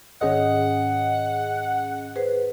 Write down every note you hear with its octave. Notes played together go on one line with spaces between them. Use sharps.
G#2 D#3 C#4 G#4 D#5 F#5
G#4 B4 C5